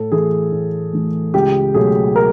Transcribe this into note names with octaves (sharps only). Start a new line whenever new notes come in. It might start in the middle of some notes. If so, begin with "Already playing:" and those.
Already playing: A2 A4
E3 A3 G#4
A2
E3 A3
C#2 G4
B2 F#3 A3 G#4
A#4